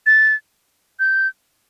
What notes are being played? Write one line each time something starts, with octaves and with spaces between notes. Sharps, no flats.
A6
G6